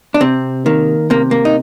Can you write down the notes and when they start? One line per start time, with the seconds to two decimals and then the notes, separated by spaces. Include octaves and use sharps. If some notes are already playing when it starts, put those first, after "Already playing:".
0.14 D4
0.21 C3 C4
0.66 D#3 A#3
1.10 C3 A#3
1.31 A#3
1.45 D#4